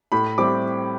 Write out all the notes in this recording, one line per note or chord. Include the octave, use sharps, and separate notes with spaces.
A2 B5
G3 C4 E4 D6